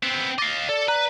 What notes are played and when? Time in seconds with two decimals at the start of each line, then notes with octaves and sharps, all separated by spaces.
0.03 B3 C4
0.38 D#5 F5 D6 A6
0.69 A4 D5
0.88 B4 A#5